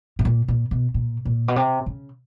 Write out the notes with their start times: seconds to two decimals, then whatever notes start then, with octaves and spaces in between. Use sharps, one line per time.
0.19 A2
0.25 A#2
0.48 A#2
0.71 B2
0.94 A#2
1.25 A#2
1.48 B2
1.56 C3
1.86 C#3